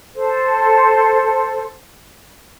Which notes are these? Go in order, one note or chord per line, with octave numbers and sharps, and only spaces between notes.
A4 C5